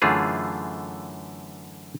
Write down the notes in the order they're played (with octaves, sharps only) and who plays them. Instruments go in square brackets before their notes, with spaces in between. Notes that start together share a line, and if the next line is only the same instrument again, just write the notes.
[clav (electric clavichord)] F#2 D3 E3 A3 F4 G#4